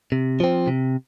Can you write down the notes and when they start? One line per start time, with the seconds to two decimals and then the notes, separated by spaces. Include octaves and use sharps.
0.12 C3
0.40 F3 C4
0.68 C3